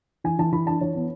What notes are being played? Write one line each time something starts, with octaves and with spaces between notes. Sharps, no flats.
E3 G#5
E3 A5
E3 B5
D4 A5
E3 C#5
B3